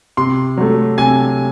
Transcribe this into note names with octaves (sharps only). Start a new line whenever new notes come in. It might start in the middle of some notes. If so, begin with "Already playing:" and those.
C3 C6
F#3 A3
C3 G#5